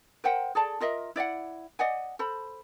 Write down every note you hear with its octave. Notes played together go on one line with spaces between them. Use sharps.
A#4 C5 F#5 G5
G#4 A4 D5 A5
F4 A#4 D#5 E5
E4 D5 F5 F#5
D5 D#5 F#5 G#5
A4 C5 B5